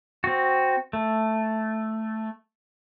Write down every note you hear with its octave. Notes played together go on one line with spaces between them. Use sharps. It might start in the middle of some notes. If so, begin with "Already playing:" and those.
C4 F#4
A3